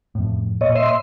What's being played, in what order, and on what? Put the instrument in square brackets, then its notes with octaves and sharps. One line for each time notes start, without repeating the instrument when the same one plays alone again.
[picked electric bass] F2 A2
[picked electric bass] A#2 [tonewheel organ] C#5 D#5
[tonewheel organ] D#5 E5 C6